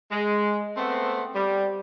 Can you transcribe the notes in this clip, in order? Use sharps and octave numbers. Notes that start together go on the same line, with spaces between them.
G#3
A3 B3 C4
G3